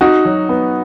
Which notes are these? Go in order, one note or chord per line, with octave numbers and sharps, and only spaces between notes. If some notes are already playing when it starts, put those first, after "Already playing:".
D#4 F#4
F#3
B3